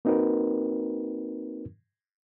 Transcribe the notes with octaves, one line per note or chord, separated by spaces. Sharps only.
A#3 C4 D#4 F#4 A#4 B4